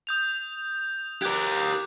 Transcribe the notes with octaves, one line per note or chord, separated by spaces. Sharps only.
D#6 G6 F7
G4 A#4 D6 F#6 G#6